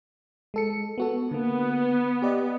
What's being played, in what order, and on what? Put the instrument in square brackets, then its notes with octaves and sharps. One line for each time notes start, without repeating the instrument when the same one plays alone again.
[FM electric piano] G#3 A4 C#7
B3 F#4 A4
[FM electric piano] D3 A#3 [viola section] B3
[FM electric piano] G4 D5 D#5